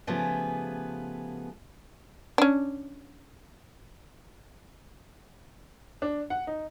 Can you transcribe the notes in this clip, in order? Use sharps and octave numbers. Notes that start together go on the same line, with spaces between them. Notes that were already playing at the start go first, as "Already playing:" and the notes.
C#3 F3 A3 B3 G4 G#4
C#4 D4
D4
F#5
D#4